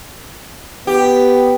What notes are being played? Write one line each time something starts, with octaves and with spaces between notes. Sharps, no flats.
B3 G4